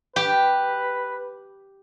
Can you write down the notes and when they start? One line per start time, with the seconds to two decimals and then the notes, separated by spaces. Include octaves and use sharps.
0.16 G4 B4